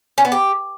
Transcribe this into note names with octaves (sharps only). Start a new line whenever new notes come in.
C#4
B3
G4